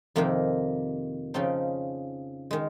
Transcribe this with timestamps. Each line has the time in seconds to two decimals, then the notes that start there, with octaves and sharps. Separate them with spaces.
0.16 F2 C3 D#3 A#3
1.34 C#3 F3 C4 D#4
2.51 D#3 G#3